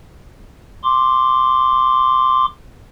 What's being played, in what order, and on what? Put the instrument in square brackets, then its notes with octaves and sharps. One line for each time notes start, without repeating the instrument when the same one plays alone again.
[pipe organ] C6 D6